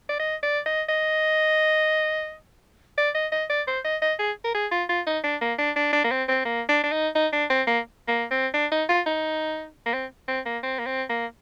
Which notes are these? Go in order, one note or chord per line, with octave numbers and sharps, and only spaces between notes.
D5
D#5
D5
D#5
D#5
D5
D#5
D#5
D5
C5
D#5
D#5
G#4
A#4
G#4
F4
F4
D#4
D4
A#3
D4
D4
D4
A#3
C4
C4
A#3
D4
D4
D#4
D#4
D4
C4
A#3
A#3
C4
D4
D#4
F4
D#4
A#3
C4
C4
A#3
C4
A#3
C4
A#3